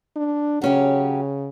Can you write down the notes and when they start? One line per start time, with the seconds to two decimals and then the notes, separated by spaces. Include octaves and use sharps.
0.16 D4
0.62 C#3 F#3 C#4 G4